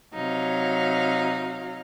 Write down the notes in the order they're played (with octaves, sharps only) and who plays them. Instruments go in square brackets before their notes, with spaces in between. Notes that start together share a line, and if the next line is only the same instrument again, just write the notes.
[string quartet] C3 F#3 D#4 F5